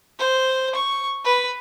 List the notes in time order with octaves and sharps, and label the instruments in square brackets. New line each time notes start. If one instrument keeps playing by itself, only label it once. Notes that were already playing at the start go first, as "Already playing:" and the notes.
[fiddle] C5
C#6
B4